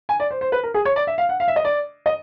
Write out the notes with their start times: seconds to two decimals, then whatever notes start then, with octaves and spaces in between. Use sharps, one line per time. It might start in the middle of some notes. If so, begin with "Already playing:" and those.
0.09 G#5
0.20 D5
0.31 C5
0.41 C5
0.52 B4
0.63 A#4
0.74 G#4
0.85 C#5
0.96 D5
1.07 E5
1.18 F5
1.29 F#5
1.40 F5
1.48 E5
1.56 D#5
1.65 D5
2.06 D#5